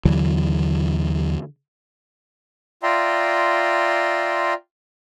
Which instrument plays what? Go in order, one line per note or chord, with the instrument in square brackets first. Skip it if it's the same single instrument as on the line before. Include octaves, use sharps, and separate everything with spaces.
[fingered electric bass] D#2 D3 E3 F#3
[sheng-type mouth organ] F4 D5 E5 G5 A#5 C6